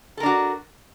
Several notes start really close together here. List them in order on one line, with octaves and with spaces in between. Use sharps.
A4 A#4 D4 F#4